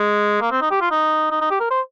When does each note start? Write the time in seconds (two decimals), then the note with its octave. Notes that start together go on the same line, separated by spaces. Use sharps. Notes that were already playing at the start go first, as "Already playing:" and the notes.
Already playing: G#3
0.41 A#3
0.52 C4
0.61 D#4
0.71 G4
0.81 F4
0.91 D#4
1.31 D#4
1.41 D#4
1.51 G4
1.60 A#4
1.70 C5